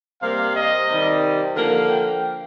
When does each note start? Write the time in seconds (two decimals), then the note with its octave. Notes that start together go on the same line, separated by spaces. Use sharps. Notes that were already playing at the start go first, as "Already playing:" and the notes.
0.22 C3 G3 A#3 F5
0.55 D#5
0.88 C3 D#3 G3
1.55 D3 F3 A#3 F5
1.89 G5